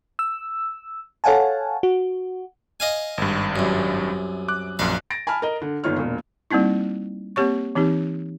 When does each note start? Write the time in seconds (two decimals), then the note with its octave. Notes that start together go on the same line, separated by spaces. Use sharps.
0.19 E6
1.24 A4 C#5 F5 F#5 G#5 A5
1.83 F#4
2.80 D#5 F5 G#5
3.18 G#1 G2
3.56 C2 F#2
4.48 D6 F#6
4.79 A#1 F#2 F5
5.10 A6 A#6 D7
5.27 G#5 A5 B5 F6
5.42 A#4 D#5
5.62 D3
5.84 G1 D#3 A#3 F4 C#5 F6
5.96 E1 A#2
6.51 G3 A#3 C4 D#4 E4
7.36 A#3 C4 G4 C#5 C#6
7.75 E3 C4 D#4 G4